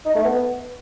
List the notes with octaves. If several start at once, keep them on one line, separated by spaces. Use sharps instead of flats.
D#4
A3
B3